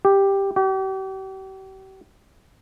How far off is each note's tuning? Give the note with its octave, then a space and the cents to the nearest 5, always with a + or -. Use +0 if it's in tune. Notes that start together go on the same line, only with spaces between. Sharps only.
G4 +5
G4 -40